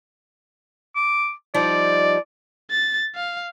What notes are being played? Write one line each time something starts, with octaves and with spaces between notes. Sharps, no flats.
D6
F3 G3 D#4 D5
A6
F5